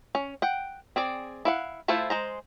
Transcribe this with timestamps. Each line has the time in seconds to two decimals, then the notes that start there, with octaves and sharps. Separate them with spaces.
0.15 C#4
0.42 F#5 G5
0.96 C4 G#4 D5
1.45 E4 F5 F#5
1.88 A3 E4 F4 A4 C5
2.10 G#3 C5 A#5